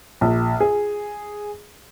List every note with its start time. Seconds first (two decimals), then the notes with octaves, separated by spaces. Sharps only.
0.21 A#1
0.60 G#4